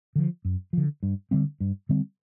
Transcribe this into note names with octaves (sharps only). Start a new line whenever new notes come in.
D3 F3
F#2
D3 F3
G2
D3 G3 C4
G2
D3 G3 C4